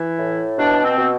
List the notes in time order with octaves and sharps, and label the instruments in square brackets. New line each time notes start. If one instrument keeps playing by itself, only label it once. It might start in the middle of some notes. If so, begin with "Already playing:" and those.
Already playing: [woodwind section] E3 E4
A2
B2 D4
C4
B2